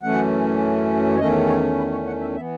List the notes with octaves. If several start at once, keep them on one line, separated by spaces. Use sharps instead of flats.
F#2 E3 A3 C#4 F#5
C#5
E2 D#3 A3 C#4 D#5
C#5
B4
C#5
F#5
E5
E3 B3 E5